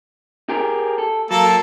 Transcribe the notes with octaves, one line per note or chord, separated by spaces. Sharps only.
G4 G#4 A#4
A4
F#3 A#3 A4 A5